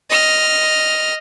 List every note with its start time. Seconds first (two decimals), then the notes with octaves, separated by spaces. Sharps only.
0.10 D#5 F6